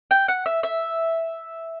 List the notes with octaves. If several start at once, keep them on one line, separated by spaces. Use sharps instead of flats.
G5
F#5
E5
E5